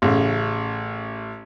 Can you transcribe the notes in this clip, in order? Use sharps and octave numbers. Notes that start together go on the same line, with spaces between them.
A1 C#3